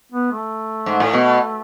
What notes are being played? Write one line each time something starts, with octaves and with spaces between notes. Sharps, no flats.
B3
A3
G#2
A2
B2